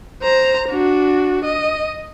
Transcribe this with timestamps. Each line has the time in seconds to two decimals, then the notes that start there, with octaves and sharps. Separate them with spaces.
0.23 C5 A#5
0.69 D4 F#4
1.45 D#5